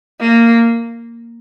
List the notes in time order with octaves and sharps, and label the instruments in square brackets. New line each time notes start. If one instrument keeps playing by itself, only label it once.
[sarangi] A#3